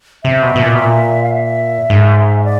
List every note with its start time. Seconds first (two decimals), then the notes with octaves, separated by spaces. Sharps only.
0.24 C3 E5
0.42 B2
0.56 B2
0.61 A#2
0.74 B2
0.79 A#2
1.23 F5
1.34 E5
1.90 G#2
2.44 D5